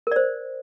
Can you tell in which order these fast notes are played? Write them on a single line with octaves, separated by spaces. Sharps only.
A#4 D5 C5